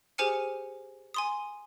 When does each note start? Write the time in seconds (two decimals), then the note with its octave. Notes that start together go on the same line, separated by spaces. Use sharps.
0.18 G4 G#4 C5 G#5 F6 C#7
1.14 G#5 C6 D#6